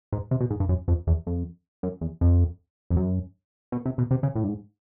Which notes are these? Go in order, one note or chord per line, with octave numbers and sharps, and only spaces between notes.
G#2
C3
B2
G#2
G2
F#2
F2
E2
F2
F#2
E2
F2
F2
F#2
B2
C3
B2
C3
C#3
A2
G2
G#2